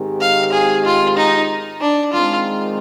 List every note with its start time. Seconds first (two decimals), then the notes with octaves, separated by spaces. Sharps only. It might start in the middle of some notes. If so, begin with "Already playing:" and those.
Already playing: G#2 D#3 G#3 C4 G4
0.21 F5
0.53 G#4
0.85 F4
1.17 D#4
1.81 D4
2.13 D#3 G#3 C4 F4